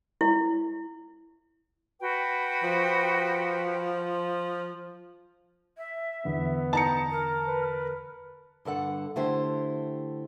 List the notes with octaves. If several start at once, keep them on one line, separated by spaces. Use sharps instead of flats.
E4
F#4 B4 G5
F3
E5
E2 D3 B3
D#4 A5 A#5 C#7
A#4
B4
G2 D3 A4 F#5
D3 A3 E4 G4 C5